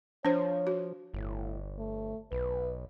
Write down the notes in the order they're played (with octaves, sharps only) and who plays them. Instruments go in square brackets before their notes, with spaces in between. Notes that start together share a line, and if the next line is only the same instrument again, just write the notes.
[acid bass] F3 [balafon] D4 C5 [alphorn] C#5
[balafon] F#4
[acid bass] G1 [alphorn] A2
[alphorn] A3
[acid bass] B1 [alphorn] B4